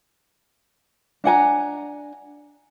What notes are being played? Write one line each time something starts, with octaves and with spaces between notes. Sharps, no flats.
D4 F#5 G#5 A#5